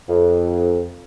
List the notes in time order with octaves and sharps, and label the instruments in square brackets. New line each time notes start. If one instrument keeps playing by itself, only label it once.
[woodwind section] F2